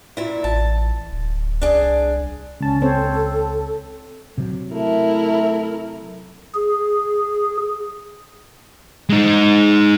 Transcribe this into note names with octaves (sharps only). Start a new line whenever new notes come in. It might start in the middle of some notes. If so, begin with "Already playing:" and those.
A#2 E4
A1 A5
D1
C2 D4 G#4
C#2 C#4 A5
C4 A4 C5 C#5
C3 F#3
A3 E4 A#4
G#4
G#3 D#4